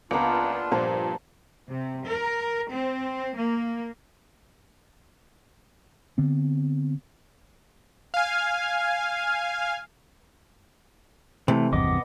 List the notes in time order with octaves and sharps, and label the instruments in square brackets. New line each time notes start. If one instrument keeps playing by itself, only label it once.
[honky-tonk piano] C#2 [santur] A#3 B3 A#4 [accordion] D4 F4
[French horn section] G2 F3 C5 [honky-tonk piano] A#2 [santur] F5 A5 A#5
[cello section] C3
A#4
C4
A#3
[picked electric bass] D3 B3 C4
[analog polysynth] F5 G#5
[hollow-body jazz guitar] C3 [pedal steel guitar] E3 A3
[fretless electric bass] G#1 E2 G2 [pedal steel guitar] B3 D#5 D6